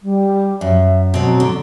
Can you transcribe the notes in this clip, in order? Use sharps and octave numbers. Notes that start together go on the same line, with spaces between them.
G3
F#2 E5
B2 F#3 C4
D3